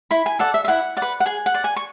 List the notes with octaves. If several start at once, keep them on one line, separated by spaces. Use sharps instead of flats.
E4 B5
G#5
A4 D5 F#5
E5
E5
E4 F#5
D5 F#5
B4
F#5
G#4 G#5
F#5
D5
G#5
C#6